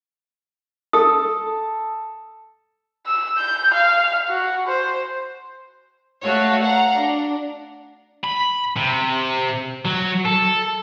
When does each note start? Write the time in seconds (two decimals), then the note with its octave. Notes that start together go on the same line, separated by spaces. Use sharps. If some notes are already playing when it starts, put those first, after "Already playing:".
0.93 A4 D#6
3.06 E6
3.37 G6
3.73 F5
4.28 F#4
4.67 C5
6.24 A3 F#4 A4 C#5 F5
6.61 F5 F#5 A#5
6.95 D4
8.24 B5
8.76 C3
9.85 F#3
10.25 A4